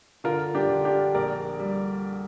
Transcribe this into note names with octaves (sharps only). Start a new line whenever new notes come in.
D3 F4 A#4
D4 G4
D3
D4 G4
A#1 A#4 D5
G3